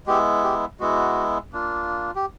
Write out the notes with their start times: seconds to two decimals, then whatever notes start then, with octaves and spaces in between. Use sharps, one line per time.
0.07 G#3 B3 E4 G4
0.44 G4
0.80 G#3 B3 E4 F#4
1.53 A#3 D4 F4
2.16 G4